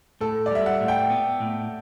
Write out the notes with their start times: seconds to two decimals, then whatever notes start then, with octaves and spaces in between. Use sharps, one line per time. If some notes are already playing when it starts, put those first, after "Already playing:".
0.21 A2 A4
0.46 D5
0.51 G3 E5
0.66 F#5
0.81 A2
0.88 G5
1.10 B3
1.41 A2